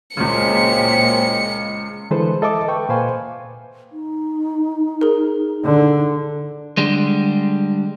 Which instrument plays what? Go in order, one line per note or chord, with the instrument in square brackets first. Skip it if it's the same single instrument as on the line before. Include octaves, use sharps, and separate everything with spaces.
[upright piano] C#2 C#3 [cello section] A#2 [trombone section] F#3 G#3 C4 [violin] C#7
[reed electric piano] D3 E3 G#3 A4 B4 C5
A4 D#5 E5 A5 D6
B4 G5 C#6
A#2 B4 C5 F5 G#5
[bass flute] D#4
[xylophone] G#4 A#4
[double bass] D3
[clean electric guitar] D3 G3 G#3